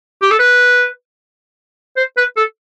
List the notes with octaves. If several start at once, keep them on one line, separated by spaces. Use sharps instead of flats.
G4
A4
B4
C5
B4
A4